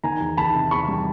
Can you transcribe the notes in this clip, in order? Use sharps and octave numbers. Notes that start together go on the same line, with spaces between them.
D#3 G#5 A#5
E2
D#3 A5 B5
C3
E2 B5 C#6
G3